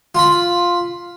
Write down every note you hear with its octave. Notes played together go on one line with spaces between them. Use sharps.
F4 B5